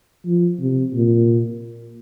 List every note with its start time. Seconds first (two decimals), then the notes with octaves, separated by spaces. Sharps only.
0.26 F3
0.60 C3
0.94 A#2